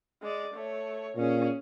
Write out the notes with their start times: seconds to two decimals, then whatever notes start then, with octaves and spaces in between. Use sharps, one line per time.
0.22 G#3 D5
0.54 A3 C#5
1.16 A#2 C#4 G#4